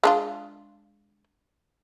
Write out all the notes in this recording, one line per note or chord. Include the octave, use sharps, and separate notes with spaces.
G#3 D4 F4